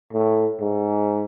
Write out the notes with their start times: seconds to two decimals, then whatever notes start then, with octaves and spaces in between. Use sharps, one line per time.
0.13 A2
0.60 G#2